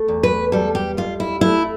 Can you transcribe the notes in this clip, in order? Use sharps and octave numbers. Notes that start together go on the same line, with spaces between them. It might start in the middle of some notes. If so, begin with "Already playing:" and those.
Already playing: A3
E2
B4
G3 A4
G4
F2 F4
E4
A3 E4